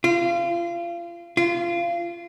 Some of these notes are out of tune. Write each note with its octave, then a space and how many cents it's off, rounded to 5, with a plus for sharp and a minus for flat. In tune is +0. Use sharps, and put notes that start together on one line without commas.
F4 -30
F4 -25